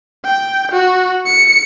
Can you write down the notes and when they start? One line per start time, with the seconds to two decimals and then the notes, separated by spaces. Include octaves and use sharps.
0.25 G5
0.71 F#4
1.26 C#7